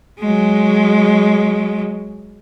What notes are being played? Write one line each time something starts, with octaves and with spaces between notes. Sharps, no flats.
F#3 G#3